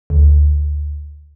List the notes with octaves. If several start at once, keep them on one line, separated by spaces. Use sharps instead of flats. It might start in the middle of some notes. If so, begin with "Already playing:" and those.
D2